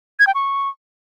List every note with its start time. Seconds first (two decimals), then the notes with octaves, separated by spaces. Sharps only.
0.20 G#6
0.27 G5
0.35 C#6